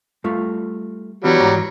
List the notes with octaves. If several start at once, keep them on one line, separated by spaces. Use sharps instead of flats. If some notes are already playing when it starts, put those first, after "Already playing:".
G3 A3 F4
E3 F#3 G3 B3 D4
G#2 E3 A#5